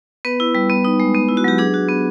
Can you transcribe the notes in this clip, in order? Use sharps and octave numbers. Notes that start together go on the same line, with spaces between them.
B3 B4
E4
G3
B3
D#4
G#3
B3
E4
F#4
F#3 G4
D4 G#4
F#4
B3